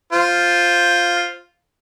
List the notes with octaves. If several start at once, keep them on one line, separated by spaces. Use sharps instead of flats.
F4 C5